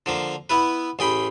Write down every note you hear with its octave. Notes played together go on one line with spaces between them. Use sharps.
D3 F3 A#3
B3 E4 B4
A1 G#4 G5 B5